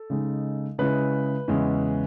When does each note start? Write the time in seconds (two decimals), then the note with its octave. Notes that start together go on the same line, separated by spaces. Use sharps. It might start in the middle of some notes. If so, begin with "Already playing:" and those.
Already playing: A4
0.10 C#3 G#3 D#4
0.79 C#3 G#3 C#4 E4 B4
1.48 E2 C#3 G#3 C#4 E4